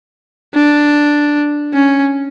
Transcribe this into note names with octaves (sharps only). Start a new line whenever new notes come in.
D4
C#4